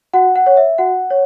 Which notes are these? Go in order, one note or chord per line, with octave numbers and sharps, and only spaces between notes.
F#4 F#5
F#5
C#5
E5
F#4 F#5
C#5